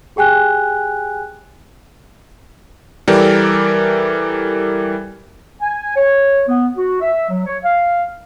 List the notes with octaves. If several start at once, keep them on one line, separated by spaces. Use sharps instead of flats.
G4 G#4 G5 G#5 F#6
E3 G3 G4 A4 A#4 D5
G#5
C#5
B3
F#4
E5
F#3
C#5
F5